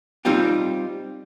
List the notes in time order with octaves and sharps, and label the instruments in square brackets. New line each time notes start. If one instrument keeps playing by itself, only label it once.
[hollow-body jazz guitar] G3 C4 D#4 F4 G4